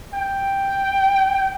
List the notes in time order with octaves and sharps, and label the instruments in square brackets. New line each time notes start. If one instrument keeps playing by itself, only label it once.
[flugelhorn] G5